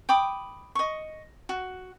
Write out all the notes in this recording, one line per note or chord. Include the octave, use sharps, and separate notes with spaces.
G5 B5 D6 D#6
D#5 C#6
F#4